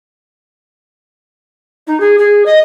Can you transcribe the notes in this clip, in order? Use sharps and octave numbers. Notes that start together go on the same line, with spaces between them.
D#4
G#4
G#4
D#5